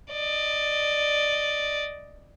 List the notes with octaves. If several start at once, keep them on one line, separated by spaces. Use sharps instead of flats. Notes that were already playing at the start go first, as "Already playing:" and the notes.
D5 D#5